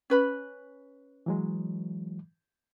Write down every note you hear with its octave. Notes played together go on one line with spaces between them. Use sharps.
C#4 B4 B5
E3 F#3 G#3